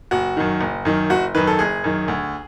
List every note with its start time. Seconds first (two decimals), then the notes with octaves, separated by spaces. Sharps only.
0.11 F#1 F#4
0.37 F#2 D#3
0.61 F#1
0.85 F#2 D#3
1.10 F#1 F#4
1.34 F#2 D#3 B4
1.47 A4
1.59 F#1 G#4
1.84 F#2 D#3
2.08 D2